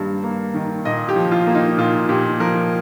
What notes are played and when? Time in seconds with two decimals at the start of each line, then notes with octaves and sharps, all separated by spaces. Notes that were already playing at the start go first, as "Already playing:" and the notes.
Already playing: G2 D#3 G3 A#3
0.24 A#3
0.54 D#3
0.85 A#2 D#5
1.09 G4
1.16 F3
1.32 F4
1.47 A#3
1.55 D#4
1.78 A#2 F4
2.09 A#2 G4
2.40 F3 A#4